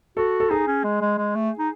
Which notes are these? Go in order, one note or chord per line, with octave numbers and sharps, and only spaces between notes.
F#4 A4
A4
D#4 G#4
C#4
G#3
G#3
G#3
A3
D#4